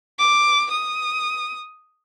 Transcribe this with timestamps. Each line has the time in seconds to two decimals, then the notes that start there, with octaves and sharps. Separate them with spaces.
0.19 D6
0.71 D#6